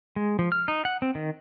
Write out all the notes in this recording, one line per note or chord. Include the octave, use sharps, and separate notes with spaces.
G#3
F3
F6
D#4
F#5
C4
D#3